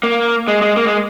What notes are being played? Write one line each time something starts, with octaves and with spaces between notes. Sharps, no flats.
A#3
G#3
G#3
A#3
G#3